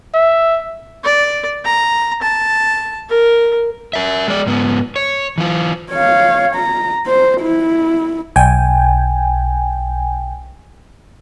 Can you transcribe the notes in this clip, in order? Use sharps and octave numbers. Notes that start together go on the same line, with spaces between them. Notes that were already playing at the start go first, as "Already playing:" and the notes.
E5
D5
A#5
A5
A#4
A#4 E5
G#3 D5
G#2 B3
C#5
E3 F4
C#5 F5
A#5
C5
E4
B1 G5 G#5